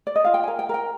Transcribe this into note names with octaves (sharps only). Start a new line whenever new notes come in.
D5
D#5
F4 F5
G5
G#5
A#4
G5
A#4 G5